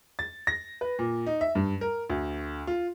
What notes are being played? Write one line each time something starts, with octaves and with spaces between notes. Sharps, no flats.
A6
A#6
B4
A#2
D#4
E5
G2
A#4
D2
F4